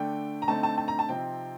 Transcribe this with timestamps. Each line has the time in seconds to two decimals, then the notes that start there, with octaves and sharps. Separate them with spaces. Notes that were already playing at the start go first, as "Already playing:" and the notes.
Already playing: D3 A3 D4 G5
0.42 A#5
0.48 D3 A3 C4 D#4 A5
0.63 A5
0.78 A5
0.88 A#5
0.99 A5
1.09 C3 F3 C4 D#4 G5